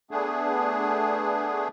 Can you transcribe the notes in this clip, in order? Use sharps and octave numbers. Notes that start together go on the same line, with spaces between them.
A3 B3 D4 G#4